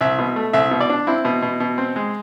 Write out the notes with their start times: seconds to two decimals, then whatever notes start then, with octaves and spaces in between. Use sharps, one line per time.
0.01 C2 E5
0.19 B2
0.36 A3
0.53 C2 E5
0.71 B2
0.80 D5
0.89 D4
1.07 C4 E4
1.25 B2
1.42 B2
1.60 B2
1.78 C4
1.96 G#3